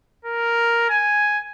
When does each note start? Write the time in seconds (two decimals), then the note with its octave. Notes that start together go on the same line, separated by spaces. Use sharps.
0.25 A#4
0.89 G#5